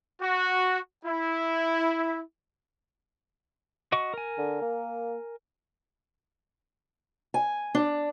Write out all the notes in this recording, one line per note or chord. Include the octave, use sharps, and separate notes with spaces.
F#4
E4
F#4 D#5 C#6
A#4 G#5
D3
A#3
G#5
D4